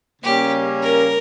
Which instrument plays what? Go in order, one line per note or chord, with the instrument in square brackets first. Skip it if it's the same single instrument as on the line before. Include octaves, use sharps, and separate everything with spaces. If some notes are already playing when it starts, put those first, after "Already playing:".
[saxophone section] C#3 G3 A#3 C#4 [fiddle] G4
[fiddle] A#4